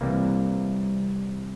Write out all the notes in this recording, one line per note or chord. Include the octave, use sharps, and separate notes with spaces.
C2 C3 E3 G3 A#3